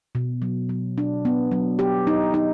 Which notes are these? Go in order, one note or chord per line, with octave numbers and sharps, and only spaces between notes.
B2
F#3
F#3
D4
B3
F#3
G4
D#4
D#4